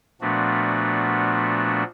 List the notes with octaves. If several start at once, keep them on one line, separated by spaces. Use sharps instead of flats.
A#2 F3 A3 B3 D4 F#4